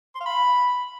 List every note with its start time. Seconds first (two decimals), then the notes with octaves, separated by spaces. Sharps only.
0.15 C6
0.20 F5
0.26 B5